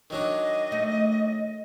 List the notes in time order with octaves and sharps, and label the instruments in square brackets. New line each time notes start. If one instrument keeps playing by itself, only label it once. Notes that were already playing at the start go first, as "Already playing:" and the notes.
[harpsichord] D#3 F#3 D4 [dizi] D#5
[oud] A3